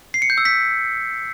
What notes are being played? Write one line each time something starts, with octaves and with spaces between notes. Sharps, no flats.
C7
C#7
G6
E6
B6